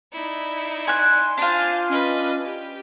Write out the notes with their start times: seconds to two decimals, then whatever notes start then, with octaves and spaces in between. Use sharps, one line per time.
0.13 D#4 E4 D5
0.87 G#5 C6 F#6
1.38 D4 F4 C5 F5 G#5
1.90 C#4 B4 D#5
2.44 G4